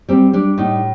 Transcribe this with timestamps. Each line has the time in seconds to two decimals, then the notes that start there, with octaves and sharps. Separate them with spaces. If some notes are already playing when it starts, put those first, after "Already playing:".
0.09 G3 C4
0.33 G3 D4
0.58 A2 D#4